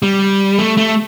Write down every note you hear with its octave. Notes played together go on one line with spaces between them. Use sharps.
G3
A3
A3